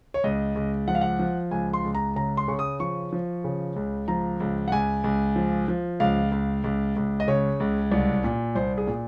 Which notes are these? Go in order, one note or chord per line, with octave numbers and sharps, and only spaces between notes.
C#5
C#2 D#5
C#2
F3 F#5
F5
F#5
F3
C#2 G#5
C6
C#2
A#5
C#3 A#5
C6
C#3 C#6
D#6
F3 C#6
F3
C#3
C#2
F3 A#5
C#2
F#5
C#2 G#5
C#2
F3
F3
C#2 F5
C#2
C#2
C#2
D#5
C#3 C#5
C#2
C2
A#2
C2 C5
G#4
A#2